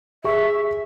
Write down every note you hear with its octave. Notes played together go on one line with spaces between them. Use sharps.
G#4 E5 C#6